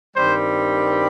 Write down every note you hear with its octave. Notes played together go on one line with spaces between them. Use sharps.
G2 D#3 G3 C4 C5